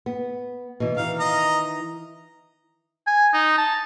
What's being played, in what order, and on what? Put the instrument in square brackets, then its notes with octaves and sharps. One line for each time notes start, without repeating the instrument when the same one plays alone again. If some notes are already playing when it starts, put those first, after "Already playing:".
[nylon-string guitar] B3
B2 E3
[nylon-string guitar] D#3 E3 [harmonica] F5
[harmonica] D#5 A#5
[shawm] G#5
D#4
A5